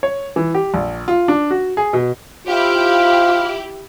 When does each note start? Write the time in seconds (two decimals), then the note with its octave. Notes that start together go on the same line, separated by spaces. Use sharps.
0.03 C#5
0.36 E3
0.54 G4
0.74 A#1
1.08 F4
1.28 D4
1.50 F#4
1.77 G#4
1.93 B2
2.47 E4 F4 G4 C5 F5